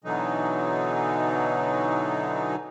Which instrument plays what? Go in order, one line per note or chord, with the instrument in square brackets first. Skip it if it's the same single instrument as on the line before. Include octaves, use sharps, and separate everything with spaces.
[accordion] B2 D3 E3 F#3 D#4